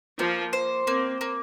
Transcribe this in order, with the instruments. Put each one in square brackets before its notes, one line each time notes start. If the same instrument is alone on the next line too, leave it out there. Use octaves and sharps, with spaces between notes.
[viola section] F3 [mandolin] A#3
[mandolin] C5
[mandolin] A#3 [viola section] C4
[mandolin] A#3